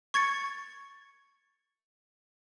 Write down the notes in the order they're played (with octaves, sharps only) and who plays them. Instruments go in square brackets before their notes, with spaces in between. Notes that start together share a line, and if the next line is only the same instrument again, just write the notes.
[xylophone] C#6 G#6 A6 C#7